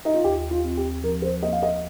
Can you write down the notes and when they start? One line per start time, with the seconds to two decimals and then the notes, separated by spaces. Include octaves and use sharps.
0.05 D#4
0.14 F4
0.24 D#2 G4
0.51 F4
0.64 C4
0.77 G4
1.03 F3 A#4
1.22 C5
1.42 A#3 D#5
1.53 F5
1.62 D#5